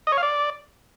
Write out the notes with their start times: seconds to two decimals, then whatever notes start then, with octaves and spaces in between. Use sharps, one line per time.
0.07 D#5
0.12 C#5
0.17 F5
0.23 D5